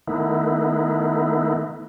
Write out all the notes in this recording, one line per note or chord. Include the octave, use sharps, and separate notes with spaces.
D#3 A3 B3 D#4 E4